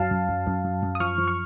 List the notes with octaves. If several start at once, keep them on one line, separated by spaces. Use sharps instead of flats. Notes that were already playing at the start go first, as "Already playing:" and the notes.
Already playing: F#2 F#3 F5 A5
F#2
F#2
F#2
F#2
F#2
D#6
F3 C#6 F6
F3
C#6 F6